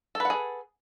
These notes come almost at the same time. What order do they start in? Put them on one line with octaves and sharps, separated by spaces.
A4 B4 F#5 G#4